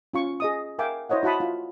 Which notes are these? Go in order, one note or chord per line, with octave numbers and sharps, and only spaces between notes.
C#4 F4 C#6
G#4 D#5 D#6
A#4 E5 F5 G5 G#5 D6
E4 C5 C#5 D#5 F#5
E4 F#4 F#5 A5 B5 D#6
F4